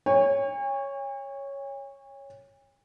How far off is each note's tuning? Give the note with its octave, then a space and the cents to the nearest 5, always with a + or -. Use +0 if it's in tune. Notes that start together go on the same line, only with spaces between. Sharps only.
C#5 +0 G#5 -45